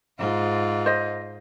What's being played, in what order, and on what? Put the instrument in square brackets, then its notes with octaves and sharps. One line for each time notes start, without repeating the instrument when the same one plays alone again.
[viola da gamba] G#2 F4
[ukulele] C5 D#5